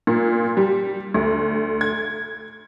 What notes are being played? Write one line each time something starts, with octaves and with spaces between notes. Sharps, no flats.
A#2
G3
D2
G#6